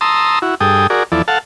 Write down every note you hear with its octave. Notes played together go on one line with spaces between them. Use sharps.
A5 A#5 C6 D#6 E6
E4 F#4
G2 G#4 A4 G5 D#6
F#4 G#4 A#4 D5
E2 F3 E4 A4 D5
A4 F5 F#5 A5